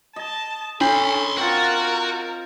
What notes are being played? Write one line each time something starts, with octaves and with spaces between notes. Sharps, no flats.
D#5 A5
C#4 D4 A4 B5 C6
C4 F4 F#4 A#4